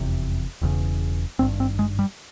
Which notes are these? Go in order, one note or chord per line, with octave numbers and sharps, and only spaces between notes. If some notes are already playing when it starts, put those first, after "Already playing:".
Already playing: F1 E2 C3
E1 E2 C#3
G#1 G2 C4
C4
G#3
G3